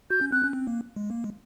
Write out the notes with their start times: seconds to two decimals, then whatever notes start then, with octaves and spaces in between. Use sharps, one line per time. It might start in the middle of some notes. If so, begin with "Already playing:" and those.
0.10 F#4 G6
0.21 C#4
0.32 C4 F#6
0.44 C#4
0.53 C4
0.67 A#3
0.96 G#3
1.11 A#3
1.24 G#3